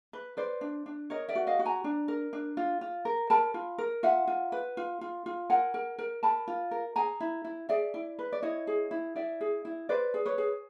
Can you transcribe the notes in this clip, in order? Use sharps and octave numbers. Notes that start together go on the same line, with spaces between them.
B4
B4 C5 D5
D4
D4
A#4 C#5 D#5
D5 E5
F#4
D#5 F5
F#4
G#5 A#5
D4
A#4
D4
F4
F4
A#4
A#4 A5 B5
F4
A#4
F4 E5 F#5
F4
B4
F4
F4
F4
A#4 F#5 G#5
A#4
A#4
A#4 A5 B5
F4
A#4
G#4 G#5 A#5
E4
E4
G#4 D5 E5
E4
B4
D5
E4 C#5 D#5
G#4
E4
E4 D5 E5
G#4
E4
B4 C5 D5
G#4
B4 C#5
G#4